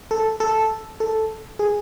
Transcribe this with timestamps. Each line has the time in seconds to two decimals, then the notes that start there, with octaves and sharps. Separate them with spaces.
0.11 A4
0.40 A4
1.00 A4
1.59 G#4